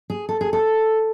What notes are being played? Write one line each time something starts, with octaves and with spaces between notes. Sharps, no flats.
G#4
A4
G#4
A4